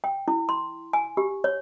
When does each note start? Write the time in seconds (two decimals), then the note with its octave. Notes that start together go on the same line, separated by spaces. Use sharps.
0.04 G5
0.28 E4
0.49 C6
0.93 G#5
1.17 G4
1.44 C#5